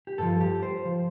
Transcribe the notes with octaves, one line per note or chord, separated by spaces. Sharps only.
G4
G2 F3 A4
G4
C5
F3